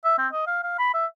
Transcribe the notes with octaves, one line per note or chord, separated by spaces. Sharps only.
E5
C4
D#5
F5
F5
B5
E5